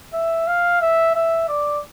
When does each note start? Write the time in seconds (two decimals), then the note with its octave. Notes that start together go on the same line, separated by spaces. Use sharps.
0.13 E5
0.47 F5
0.81 E5
1.15 E5
1.48 D5